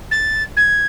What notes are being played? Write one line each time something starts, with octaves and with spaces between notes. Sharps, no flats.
A6
G#6